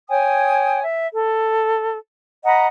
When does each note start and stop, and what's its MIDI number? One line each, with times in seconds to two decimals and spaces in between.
0.09 0.83 73
0.09 0.83 79
0.09 0.83 80
0.09 0.83 87
0.83 1.08 76
1.13 1.97 69
2.44 2.67 75
2.44 2.67 78
2.44 2.67 82
2.44 2.67 83